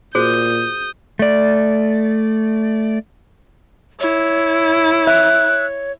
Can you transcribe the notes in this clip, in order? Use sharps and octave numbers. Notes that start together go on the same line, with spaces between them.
A#2 F#4 G#4 C5 D#6 G6
A3 D5
E4 C#5
E5 F#6